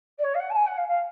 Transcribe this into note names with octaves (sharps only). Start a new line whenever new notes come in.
D5
C#5
F5
F#5
A5
G#5
F#5
F5
F5